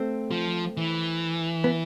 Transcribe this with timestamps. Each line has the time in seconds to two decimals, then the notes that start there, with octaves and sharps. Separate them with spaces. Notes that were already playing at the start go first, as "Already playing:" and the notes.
Already playing: A3 C4
0.31 F3
0.77 E3
1.64 B3